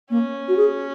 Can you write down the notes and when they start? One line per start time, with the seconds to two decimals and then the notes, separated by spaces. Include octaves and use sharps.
0.10 A#3 C#4
0.48 F#4
0.57 G#4